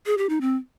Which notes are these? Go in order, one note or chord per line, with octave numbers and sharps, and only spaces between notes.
G#4
G4
D#4
C4